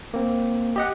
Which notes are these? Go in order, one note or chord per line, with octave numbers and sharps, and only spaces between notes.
A#3 C4
G4 D#5 F#5